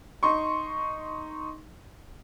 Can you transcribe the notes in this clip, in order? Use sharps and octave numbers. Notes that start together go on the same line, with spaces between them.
D#4 C6 C#6